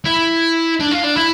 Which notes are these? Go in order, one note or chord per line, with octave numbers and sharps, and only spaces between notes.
E4
D4
F4
D4
E4